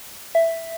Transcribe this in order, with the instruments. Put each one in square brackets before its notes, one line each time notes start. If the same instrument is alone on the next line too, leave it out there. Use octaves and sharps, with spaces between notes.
[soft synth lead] E5